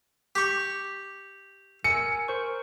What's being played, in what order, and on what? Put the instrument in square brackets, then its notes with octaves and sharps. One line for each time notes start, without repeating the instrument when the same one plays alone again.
[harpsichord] G4 C#6
[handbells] A#4 G#5 E6 [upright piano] C#7
[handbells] A#4 C5 C#6